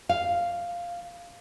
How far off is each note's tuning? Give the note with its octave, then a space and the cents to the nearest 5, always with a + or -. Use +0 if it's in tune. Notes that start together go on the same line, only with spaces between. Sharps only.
F5 +0